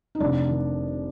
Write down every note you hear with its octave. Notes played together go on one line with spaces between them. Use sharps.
D#4
F1 D4
D#3